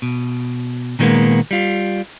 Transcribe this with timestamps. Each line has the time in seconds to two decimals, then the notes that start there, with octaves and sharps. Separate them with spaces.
0.02 B2
0.99 A#2 D#3 G3 G#3 A#3 B3
1.51 G3 F4